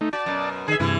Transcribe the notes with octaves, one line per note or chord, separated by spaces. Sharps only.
A3 D#4
F#4 D5 A5
F#2 B2
D#3 G#4 E5
G2 C3 E3 E4